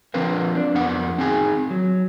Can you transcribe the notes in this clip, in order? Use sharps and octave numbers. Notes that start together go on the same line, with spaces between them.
F3 C4 D4 A#4 B4 F5
D4
F2 B3 A#4 F#5
C4 D#4 G#4 G#5
F#3